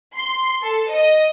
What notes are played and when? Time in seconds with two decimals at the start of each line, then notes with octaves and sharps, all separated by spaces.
0.15 C6
0.63 A4
0.92 D#5